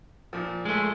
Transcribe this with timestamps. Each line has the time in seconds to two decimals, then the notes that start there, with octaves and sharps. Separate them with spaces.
0.33 A#2 F3
0.65 G#3 A3